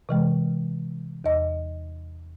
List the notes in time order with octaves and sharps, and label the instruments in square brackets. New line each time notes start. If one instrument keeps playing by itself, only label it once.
[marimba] C3 E3 G#3
E2 D#5